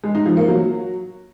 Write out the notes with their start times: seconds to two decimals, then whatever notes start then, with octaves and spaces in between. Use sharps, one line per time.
0.04 G#3
0.15 D#4
0.26 F3
0.37 A#3
0.48 F#3